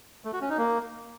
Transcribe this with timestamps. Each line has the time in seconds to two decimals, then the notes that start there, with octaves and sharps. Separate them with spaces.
0.25 A3
0.33 F#4
0.41 C#4
0.50 D#4
0.58 A#3